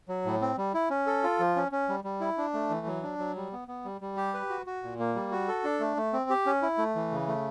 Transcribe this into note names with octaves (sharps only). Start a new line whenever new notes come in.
F#3
A2
C4
G3
E4
C#4
A4
F4
F3
C#4
C#4
G3
G3
E4
D4
A3
E3
F#3
D4
F#3
G3
B3
B3
G3
G3
G4
B4
F#4
F#4
A#2
A#3
G3
F#4
A4
D4
A3
A3
C4
G4
C#4
E4
A3
E3
C#3
A3